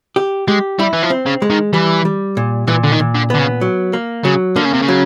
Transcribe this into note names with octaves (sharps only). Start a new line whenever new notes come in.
G4
G#3 G4
G3 E4
E3
F3
C4
C#3
G#3
D#3
E3 G3
G3
A#2
A#2 E3
D3
D#3
A#2
D3
D3 B3
C#3
F#3
A#3
C#3 F#3
D3 A#3
C#3
C3
C#3
F#3